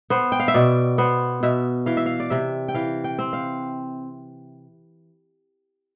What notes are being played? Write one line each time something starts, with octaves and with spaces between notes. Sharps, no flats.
B3 C5
G5
F5
E5
B2 D5
B3 C5
B2 E5
E3 F5
E5
F5
D5
C3 E5
G5
E3 F5
G5
C4
F5